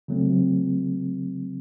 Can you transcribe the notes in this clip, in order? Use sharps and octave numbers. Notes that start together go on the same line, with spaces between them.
C#3 F#3 A3 C4